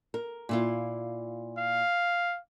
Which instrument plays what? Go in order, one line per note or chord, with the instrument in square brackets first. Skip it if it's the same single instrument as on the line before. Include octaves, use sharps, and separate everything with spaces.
[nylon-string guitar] A#4
A#2 E4 F4
[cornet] F5